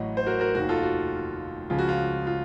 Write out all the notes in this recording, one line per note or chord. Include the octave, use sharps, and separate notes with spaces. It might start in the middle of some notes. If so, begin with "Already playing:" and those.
Already playing: A1 A2 F#3 C#5 D#5 F#5
C5
F#4 A#4
F#4 A#4
F1 D#2 D#3 F#4
F4 A4
F#4
C#2 C#3 F3 F4
F#4
F4
F4